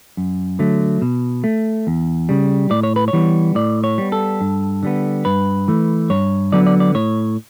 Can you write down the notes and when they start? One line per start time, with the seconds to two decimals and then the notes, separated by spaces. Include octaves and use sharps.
0.17 F#2
0.59 D3 F#3 A3
1.02 B2
1.44 A3
1.87 E2
2.29 C#3 G3
2.70 A2 D5
2.83 C#5
2.96 B4
3.08 C#5
3.13 E3 G3 B3
3.55 A2 D5
3.84 C#5
3.98 G3 B3
4.12 A4
4.41 G2
4.83 D3 G3 B3
5.25 G2 B4
5.68 E3 A3
6.10 G2 C#5
6.52 D3 F#3 B3 D5
6.67 D5
6.80 D5
6.95 A2 C#5